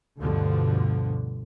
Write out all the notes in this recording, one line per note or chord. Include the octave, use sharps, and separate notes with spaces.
D2 G2 B2 D3 F3